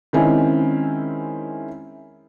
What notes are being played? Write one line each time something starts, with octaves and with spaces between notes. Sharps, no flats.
D#3 G#3 C4 C#4 E4